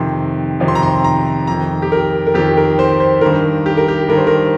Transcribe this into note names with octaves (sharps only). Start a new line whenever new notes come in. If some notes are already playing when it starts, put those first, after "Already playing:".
Already playing: F2 C3 D#3 C6
F2 C3 D#3
C6
A#5
C6
A#5
F2 D#3 A#5
G4
A#4
A#4
F2 D#3 G4
A#4
C5
C5
G2 D#3 A#4
G4
A#4
G4
G2 D#3 A#4
C5
A#4